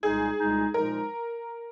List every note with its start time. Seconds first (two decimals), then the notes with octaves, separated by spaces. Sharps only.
0.02 C2 A#2 G#3 D#4 G#4
0.38 C2 A#2 G#3 D#4
0.74 A#2 F3 G#3 D#4 A#4